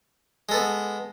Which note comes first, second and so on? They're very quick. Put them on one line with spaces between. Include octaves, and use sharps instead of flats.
G#3 A4 B3